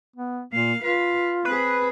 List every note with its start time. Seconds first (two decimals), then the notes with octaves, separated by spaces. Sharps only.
0.16 B3
0.53 A#2 A#3 F5
0.83 F4 B4 F5
1.45 C4 G#4 B4